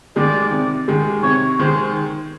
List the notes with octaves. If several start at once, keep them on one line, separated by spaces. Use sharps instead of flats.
D#3 G#3 D5
C3
D#3 G#3
C3 C#5
D#3 G#3 C5